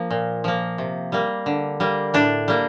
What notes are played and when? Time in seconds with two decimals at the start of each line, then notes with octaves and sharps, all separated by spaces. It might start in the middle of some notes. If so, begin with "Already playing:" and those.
Already playing: F3 A#3
0.11 A#2
0.44 F3 A#3
0.78 C3
1.12 G3 A#3
1.46 D3
1.80 G3 A#3
2.14 A2 D4
2.48 G3 A#3